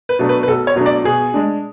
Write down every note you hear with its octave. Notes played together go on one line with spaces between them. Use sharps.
B4
B2 F#3 A3 D4
B4
B4
B1 A4
C#5
B2 F#3 A3 D4
D5
B2 G#4
G#3 D4